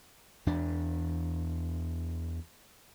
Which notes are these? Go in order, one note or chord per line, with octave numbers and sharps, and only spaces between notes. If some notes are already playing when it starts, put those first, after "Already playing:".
E2 D4